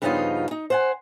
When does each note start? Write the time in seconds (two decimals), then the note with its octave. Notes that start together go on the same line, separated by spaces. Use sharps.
0.02 G2 C#3 F3 B3 D#4 F4
0.51 D#4
0.70 C5 F#5 G#5